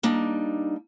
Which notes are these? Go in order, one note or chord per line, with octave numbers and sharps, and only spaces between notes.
G3 A#3 D4 D#4